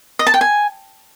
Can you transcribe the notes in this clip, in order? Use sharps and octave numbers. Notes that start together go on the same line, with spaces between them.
D#5
A5
G5
G#5